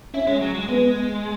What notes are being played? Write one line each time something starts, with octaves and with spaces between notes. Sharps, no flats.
C#4 E4
G#3
F#3
G#3
G#3 B3